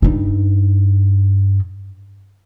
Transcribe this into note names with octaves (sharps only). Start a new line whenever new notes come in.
G2 D#4